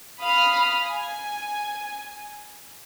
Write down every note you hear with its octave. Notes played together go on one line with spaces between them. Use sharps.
F5 B5 D#6 F6
G#5